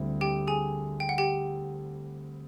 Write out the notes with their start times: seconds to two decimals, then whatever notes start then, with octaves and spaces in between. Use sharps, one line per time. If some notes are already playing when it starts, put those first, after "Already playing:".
Already playing: D2 D3 G3 C4 E4
0.21 G4 G5
0.47 G#4 G#5
1.00 G5
1.09 F#5
1.18 G4 G5